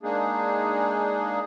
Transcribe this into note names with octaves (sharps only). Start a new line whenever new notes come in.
G#3 A#3 D4 D#4 G#4